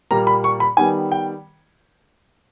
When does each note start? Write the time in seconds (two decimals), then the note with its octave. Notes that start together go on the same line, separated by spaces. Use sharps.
0.11 A#2 G3 A#3 A#5
0.27 B5
0.44 C#6
0.60 B5
0.77 D#3 G3 B3 G#5
1.12 G5